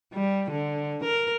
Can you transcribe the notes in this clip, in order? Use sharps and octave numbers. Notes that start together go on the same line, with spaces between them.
G3
D3
A#4